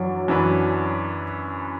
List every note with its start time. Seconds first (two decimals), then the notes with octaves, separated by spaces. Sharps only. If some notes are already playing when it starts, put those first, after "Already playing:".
Already playing: F#2 E3 F#3 D4
0.28 F#2 E3 D4 B4